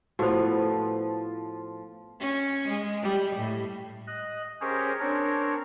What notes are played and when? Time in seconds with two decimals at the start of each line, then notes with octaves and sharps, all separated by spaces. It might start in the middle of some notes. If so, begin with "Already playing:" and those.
0.19 A2 F3 B3 F#4 C5
2.20 C#4
2.68 G#3
3.02 G3
3.36 A2
4.07 D#5 F#6
4.61 C#4 G4 G#4 A#4 C5 C#5
5.00 C4 D4 A#4 C#5